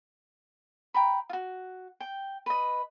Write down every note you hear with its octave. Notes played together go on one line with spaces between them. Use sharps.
G5 A#5 B5
F4 F#4
G5
B4 D#5